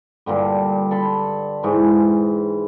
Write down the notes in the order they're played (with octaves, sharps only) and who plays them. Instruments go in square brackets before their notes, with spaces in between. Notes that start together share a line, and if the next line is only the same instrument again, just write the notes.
[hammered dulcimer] G2 A#2 D3 G3
A4 B5 C6
G#2 E3